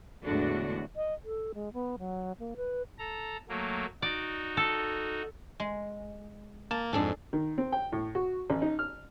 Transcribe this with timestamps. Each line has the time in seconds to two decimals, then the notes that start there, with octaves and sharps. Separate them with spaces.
0.24 E2 A2 D3 G#3 D4 F#4
0.96 D#5
1.25 A4
1.55 G#3
1.73 B3
1.99 F#3
2.40 A#3
2.57 B4
2.99 A4 A#5
3.49 F#3 A3 A#3
4.02 D#4 F#4 D5
4.57 A4
5.60 G#3
6.71 A#3 A5
6.93 F2 G#2 D4 G#4 A4
7.33 D#3
7.58 C4
7.72 G5
7.92 A2
8.15 F#4
8.50 A1
8.62 D#4
8.79 F6